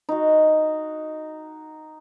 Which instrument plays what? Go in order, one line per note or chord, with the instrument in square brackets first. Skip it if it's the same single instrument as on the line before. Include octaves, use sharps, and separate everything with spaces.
[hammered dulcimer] D#4 F#4